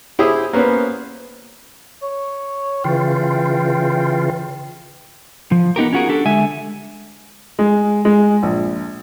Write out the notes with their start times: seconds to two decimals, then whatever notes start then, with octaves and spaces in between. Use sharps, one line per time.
0.19 E4 G4 G#4 C5 D#6
0.53 A#3 B3 C#4 B4 C5
2.02 C#5
2.84 C#3 E3 F4 G5
5.52 F3
5.76 B3 D#4 G4 A#4
5.93 C#4 F4 F#4 G#4 A#4
6.09 D4 G4 A4
6.26 D3 G#3 E5 G#5
7.59 G#3
8.05 G#3
8.43 A#1